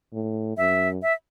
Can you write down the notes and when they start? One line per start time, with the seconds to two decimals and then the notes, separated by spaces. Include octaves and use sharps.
0.13 A2
0.57 F#2 E5
1.02 E5